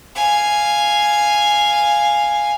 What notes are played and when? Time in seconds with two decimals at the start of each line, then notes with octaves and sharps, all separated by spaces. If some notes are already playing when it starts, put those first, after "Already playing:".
0.16 F5 G#5